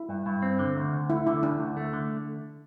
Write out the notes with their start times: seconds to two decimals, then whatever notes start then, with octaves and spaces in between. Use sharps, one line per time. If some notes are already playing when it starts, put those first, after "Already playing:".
Already playing: E4
0.09 G2
0.26 G2
0.42 C4
0.59 D3
0.76 D2
0.93 D2
1.10 A3 E4
1.27 D3 E4
1.43 D2 D4
1.60 D2
1.77 A3
1.93 D3